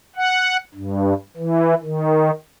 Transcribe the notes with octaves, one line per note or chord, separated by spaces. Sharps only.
F#5
G2
E3
D#3